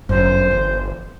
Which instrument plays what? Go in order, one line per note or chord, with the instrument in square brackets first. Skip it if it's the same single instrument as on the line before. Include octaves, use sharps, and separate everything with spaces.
[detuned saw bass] G1 [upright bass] F#2 [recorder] C5
[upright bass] E3